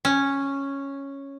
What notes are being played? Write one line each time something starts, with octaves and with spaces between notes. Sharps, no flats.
C#4